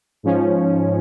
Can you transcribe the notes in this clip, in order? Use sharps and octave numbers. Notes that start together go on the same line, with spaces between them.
G#2 F3 C#4